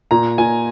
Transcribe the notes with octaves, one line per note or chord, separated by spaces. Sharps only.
A#2 A#5
A#2 G#5